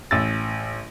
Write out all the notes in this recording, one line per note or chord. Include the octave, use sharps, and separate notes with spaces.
A1 E6 A6